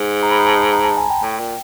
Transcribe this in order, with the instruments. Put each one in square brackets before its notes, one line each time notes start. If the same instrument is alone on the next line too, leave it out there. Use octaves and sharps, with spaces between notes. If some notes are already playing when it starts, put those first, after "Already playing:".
Already playing: [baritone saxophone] G#2
[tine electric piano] A#5
B5
A#5
A5
A#5
A5
G#5
G5
[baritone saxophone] A2
A#2